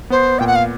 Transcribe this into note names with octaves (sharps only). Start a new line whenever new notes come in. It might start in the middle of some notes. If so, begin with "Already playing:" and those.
B3 C5
A#2 G5
F#5
F5